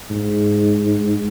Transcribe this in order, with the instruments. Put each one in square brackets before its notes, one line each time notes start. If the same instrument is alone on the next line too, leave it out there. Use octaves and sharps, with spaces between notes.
[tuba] G#2